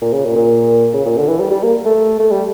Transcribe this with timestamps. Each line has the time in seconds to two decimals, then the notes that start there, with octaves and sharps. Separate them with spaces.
0.02 A#2
0.13 C#3
0.25 A#2
0.36 A#2
0.94 C#3
1.05 A#2
1.17 D3
1.28 E3
1.39 G3
1.50 G3
1.63 A#3
1.85 A3
2.19 A3
2.31 G3